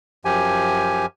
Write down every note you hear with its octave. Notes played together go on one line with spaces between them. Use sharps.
F#2 F3 G4 G#5